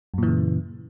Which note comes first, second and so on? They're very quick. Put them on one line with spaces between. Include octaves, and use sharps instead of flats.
F#2 A#2 E3 C#3